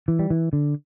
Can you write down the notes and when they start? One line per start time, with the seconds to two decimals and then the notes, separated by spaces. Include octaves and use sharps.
0.08 E3
0.19 G3
0.30 E3
0.53 D3